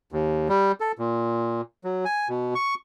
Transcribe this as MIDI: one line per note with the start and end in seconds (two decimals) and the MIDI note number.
0.12 0.48 39
0.49 0.72 55
0.80 0.92 69
0.98 1.61 46
1.84 2.05 54
2.05 2.28 80
2.29 2.54 47
2.55 2.74 85